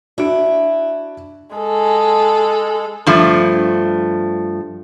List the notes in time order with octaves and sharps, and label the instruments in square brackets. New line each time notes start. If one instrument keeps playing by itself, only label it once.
[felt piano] D4 F#4 D7 [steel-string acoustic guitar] E4
[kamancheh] G#3 A4
[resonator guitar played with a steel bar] G2 F3 A3